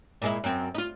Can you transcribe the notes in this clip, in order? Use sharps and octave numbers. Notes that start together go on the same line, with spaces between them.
A#2 G#3 E4
F#2 C4
D#4 F4